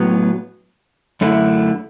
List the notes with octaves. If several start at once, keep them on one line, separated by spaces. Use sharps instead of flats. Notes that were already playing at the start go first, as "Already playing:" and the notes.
Already playing: A2 F#3 B3
F#2 D3 A3 E4